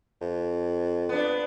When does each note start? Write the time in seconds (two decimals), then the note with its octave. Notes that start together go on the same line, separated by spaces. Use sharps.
0.21 F2
1.09 B3 D4